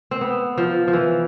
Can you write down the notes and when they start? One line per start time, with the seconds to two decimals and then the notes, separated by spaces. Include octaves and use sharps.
0.11 C4
0.21 B3
0.58 F3
0.88 F3
0.93 E3